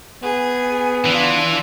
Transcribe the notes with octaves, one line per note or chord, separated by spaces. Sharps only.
B3 G#4
E3 D4 F4